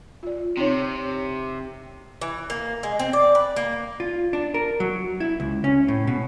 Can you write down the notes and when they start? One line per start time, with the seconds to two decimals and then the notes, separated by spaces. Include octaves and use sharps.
0.23 F4 D5
0.57 C3 C4 D#4 C#5
2.21 E3
2.50 A#3
2.83 G#3
2.99 C4
3.13 D5
3.35 B4
3.56 A#3
4.00 F4
4.33 D4
4.54 A#4
4.80 F#3
5.20 E4
5.40 C#2
5.64 C#4
5.88 A2
6.07 B2